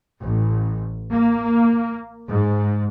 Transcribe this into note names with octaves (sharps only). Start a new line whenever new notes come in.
A1
A#3
G#2